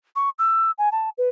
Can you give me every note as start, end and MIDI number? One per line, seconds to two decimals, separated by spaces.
0.16 0.30 85
0.39 0.71 88
0.78 0.89 80
0.92 1.10 81
1.18 1.29 71